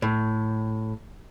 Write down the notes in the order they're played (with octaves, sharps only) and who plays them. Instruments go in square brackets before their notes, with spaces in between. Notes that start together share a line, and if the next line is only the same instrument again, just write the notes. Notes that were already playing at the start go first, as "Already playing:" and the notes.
[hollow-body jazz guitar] A2